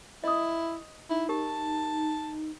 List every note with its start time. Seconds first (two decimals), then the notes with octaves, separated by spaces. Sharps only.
0.24 E4 D#5 D#6
1.10 D#4 E4
1.29 G4 A#4 A5